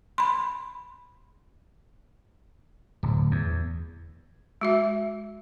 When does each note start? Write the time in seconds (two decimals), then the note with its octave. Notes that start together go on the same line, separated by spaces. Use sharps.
0.18 B5 C6
3.03 D1
3.31 E2
4.61 G#3 F#4 E5